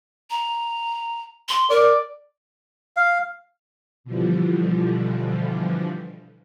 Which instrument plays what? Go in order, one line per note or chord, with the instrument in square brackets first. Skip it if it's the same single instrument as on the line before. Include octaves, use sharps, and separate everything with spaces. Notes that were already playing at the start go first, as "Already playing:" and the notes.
[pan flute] A#5
C6
[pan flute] A#4 [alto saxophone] D5
[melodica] F5
[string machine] B2 D3 E3 F3 G3